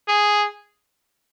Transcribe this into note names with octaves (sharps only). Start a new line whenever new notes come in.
G#4